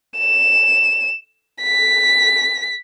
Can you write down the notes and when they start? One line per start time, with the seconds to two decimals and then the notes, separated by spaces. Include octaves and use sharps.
0.18 E7
1.63 B6